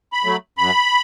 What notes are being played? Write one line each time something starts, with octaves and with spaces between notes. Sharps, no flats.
B5
F#3 A3
F#2 B5